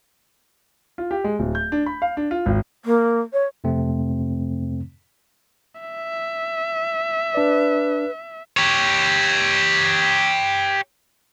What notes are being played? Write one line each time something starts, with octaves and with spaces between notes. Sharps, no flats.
F4
G4
G#3
D1
G6
D4
B5
F5
D4
F4
G#1
A#3
C#5
F2 C3 A3 C4
E5
D4 B4 D5
G4 C#5